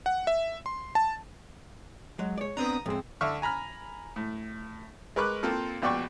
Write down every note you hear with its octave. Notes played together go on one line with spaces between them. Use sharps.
F#5
E5
C6
A5
F#3 G#3
C#5 D5
B3 C4 D4 A#5 D#6
F2 A2 G#3 C4
D3 E5 C#6 F6
G#5 A#5 B5 F6
A2
G#3 A#4 B4 C#6 D6 F#6
A#3 C4 F4 A4
A#1 B2 D5 G5 C#6